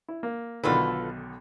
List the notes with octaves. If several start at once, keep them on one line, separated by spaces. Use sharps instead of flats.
E4
A#3
B1 D3 D#3 F4 A4 B4